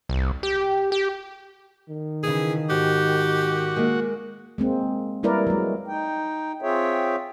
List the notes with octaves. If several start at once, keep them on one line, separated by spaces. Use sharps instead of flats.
C2
G4
G4
D#3
C#3 E3 G#4
G#2 F#4 G4
G#3 A#3
G#3 A#3 C4
G3 A#3 E4 A#4 B4 D5
F#3 G#3
D#4 G5
C4 F4 G#4 C#5 E5 G5